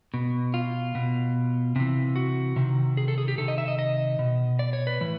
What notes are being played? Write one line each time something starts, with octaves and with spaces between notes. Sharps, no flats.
B2
F4
B2
C3 E3
F#4
C3 D#3
G#4
A4
G#4
G4
C3 D#3 A4
D#5
E5
D#5
D#5
B2
D5
C#5
B4
A2 E3